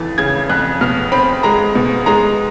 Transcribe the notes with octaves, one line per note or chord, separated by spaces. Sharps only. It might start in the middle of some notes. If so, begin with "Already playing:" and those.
Already playing: F2 E3 A6
C#3 G#6
F2 F#6
B2 F6
C4 B5
G#3 A#5
B2
G#3 A#5